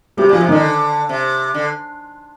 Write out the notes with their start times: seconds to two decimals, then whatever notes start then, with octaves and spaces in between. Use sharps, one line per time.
0.17 C3 G3 G4
0.29 A#2 F3 F4
0.41 C3
0.48 D3 D#3 D#4
1.09 C3
1.54 D3